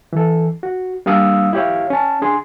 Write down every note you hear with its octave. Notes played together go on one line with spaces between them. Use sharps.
E3 A4
F#4
G3 A#3 D4 F5 D#6 E6
E4 G4 C#5 F5
C#4 A5
D4 G#4 C6